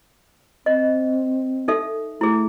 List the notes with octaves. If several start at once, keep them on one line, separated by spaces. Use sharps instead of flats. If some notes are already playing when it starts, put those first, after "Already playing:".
C4 D#5
D#4 A4 E5
A3 E4 G#4